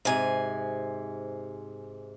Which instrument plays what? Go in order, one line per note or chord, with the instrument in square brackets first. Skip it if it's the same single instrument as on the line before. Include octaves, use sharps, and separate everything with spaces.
[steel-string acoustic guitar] G#2 C3 G#5